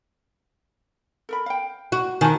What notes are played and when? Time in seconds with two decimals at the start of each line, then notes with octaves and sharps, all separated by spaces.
1.29 A4 A#4 B5
1.46 F5 G5
1.92 F#4
2.21 D#3 D#4 F#4 G#5 A5